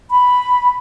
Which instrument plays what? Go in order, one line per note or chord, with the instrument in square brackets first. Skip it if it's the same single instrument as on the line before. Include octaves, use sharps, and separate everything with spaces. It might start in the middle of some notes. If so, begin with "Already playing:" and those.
[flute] B5